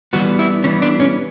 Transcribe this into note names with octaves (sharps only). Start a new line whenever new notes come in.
E3 G3 B3 F#4
E4
E3 G3 B3 C#4
D4
C#4